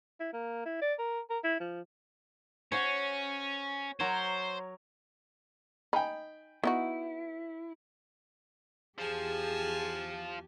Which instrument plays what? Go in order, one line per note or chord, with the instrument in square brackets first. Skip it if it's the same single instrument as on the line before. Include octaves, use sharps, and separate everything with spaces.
[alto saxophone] E4
A#3
E4
D5
A#4
A#4
E4
F3
[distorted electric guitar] C#4 [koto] F#4 C5 C#5
[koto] F#3 A#4 C#5 [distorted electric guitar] C5
[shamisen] D#4 [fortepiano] G5 G#5 B5
[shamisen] B3 D#4 F#4 [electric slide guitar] E4
[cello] E2 G4 [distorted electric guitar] F3 [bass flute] G#4 [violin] G#5 A5